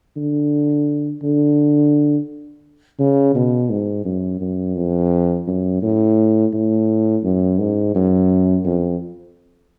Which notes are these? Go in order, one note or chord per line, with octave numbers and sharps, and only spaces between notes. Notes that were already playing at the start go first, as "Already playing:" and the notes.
D3
D3
C#3
B2
G#2
F#2
F#2
F2
F#2
A2
A2
F#2
G#2
F#2
F2